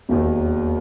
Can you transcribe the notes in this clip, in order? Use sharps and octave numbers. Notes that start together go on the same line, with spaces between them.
E1 D#2 D#3